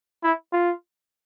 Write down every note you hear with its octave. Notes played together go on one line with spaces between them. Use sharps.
E4
F4